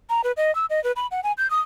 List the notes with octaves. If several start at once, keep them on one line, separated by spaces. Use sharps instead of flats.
A#5
B4
D#5
E6
D#5
B4
B5
F#5
G#5
G6
D#6